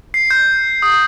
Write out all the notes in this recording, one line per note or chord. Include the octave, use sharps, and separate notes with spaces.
C7
G6
D#6